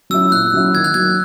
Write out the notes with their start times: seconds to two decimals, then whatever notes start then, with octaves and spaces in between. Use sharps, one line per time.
0.10 F#3 C#4 E4 E6
0.32 A#2 F#6
0.54 F#3 C#4 E4
0.74 D#3 G#6
0.84 F#6
0.94 F#3 A#3 G#6